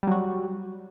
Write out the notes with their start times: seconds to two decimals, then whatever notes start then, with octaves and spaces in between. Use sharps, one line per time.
0.03 G3
0.07 F#3
0.11 F#4